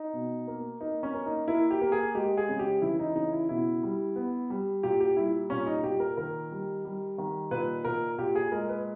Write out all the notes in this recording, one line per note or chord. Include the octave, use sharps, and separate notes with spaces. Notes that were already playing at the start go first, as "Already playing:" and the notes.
Already playing: D#4
B2
A#3
A#3 D#4
C#4
A#3
D#4
A#3 E4
G4
A#3
G#4
G#3 G4
G#4
C#3
G4
E3 E4
D#4
C#3 D#4
E4
B2 E4
G3
B3
G3
A#2 G4
G4
G3 E4
A#2 C#4
D#4
A#2 G4
A#4
D#3 A#4
G3
G3
D#3
A#2 B4
A#2 A#4
A#2 G4
G#4
G#3 A#4
B4